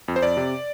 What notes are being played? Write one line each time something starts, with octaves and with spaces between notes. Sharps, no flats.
F2
C5
F2 D5
C3